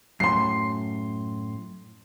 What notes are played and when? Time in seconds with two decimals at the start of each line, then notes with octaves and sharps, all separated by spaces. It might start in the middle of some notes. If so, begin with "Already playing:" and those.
0.20 F#2 A2 C6 C7